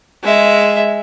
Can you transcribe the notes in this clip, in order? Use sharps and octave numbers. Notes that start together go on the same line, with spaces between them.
G#3 E5